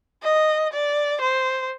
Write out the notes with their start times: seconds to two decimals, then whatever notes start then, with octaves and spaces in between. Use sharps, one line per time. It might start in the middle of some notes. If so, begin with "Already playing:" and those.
0.23 D#5
0.73 D5
1.21 C5